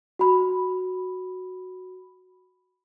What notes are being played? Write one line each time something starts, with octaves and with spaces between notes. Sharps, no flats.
F#4 B5